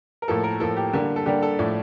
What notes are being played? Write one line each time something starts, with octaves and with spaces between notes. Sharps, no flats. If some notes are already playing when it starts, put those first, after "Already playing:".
A#4
A2 F3 A#3 A4
A#4
A2 F3 A#3 A4
G4
D3 G3 A#3
A4
D3 G3 A#3 G4
A4
A2 F3 A3 D5